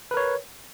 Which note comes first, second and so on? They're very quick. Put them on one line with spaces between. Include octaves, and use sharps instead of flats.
B4 A#4 C#5